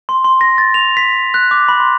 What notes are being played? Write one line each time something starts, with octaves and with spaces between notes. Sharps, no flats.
C6
C6
A#6
A6
F7
B6
F#6
D6
B5
C6